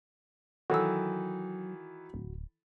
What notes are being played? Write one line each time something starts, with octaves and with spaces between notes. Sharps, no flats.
D#3 E3 F#3 F#4 A4 E6
D1